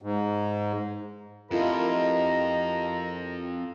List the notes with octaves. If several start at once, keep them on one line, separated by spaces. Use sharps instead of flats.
G#2
F2 E4 F4 G4 A4 A#4 D#5 A#5